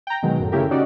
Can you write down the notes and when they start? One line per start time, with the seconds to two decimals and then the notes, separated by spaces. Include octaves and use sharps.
0.07 G5 A#5
0.23 B2 D#3 F#3 G#3
0.40 F#2 A2
0.52 C#3 A3 E4 G4 A#4
0.71 C#4 D#4 F#4 D5